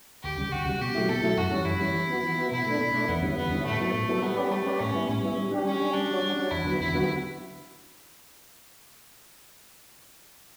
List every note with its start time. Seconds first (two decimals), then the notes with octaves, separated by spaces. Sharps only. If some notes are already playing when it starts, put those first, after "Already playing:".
0.23 D2 G4
0.38 C#3 G3
0.52 D2 F#4
0.66 C#3 G3
0.81 B2 G4
0.95 F#3 A3 E4
1.09 B2 A4
1.23 F#3 A3 E4
1.37 F#2 F#4
1.51 E3 G3 C#4
1.65 F#2 E4
1.80 E3 G3 C#4
1.95 E3
2.09 B3 F#4
2.23 E3
2.38 B3 F#4
2.51 B2 E4
2.66 A3 D4
2.79 B2
2.94 A3 D4
3.08 E2 B3
3.22 D3 G3 C#4 E4
3.37 E2 B3
3.51 D3 G3 C#4 E4
3.65 A2 A3
3.80 F#3 B3 E4 A4
3.94 A2
4.08 F#3 B3 E4 A4
4.23 G3 B3
4.36 C#4 G4 B4 D5
4.51 G3 A3
4.66 C#4 G4 B4 D5
4.79 A2 C#4
4.95 G3 B3 E4
5.08 A2 C#4
5.22 G3 B3 E4
5.37 G3
5.51 D4 G4
5.65 G3 C#4
5.79 D4 G4
5.93 G3 D4
6.08 C#4 F#4 C#5
6.22 G3
6.36 C#4 F#4 C#5
6.51 E2 E4
6.65 D3 F#3 B3 F#4
6.80 E2 E4
6.93 D3 F#3 B3 F#4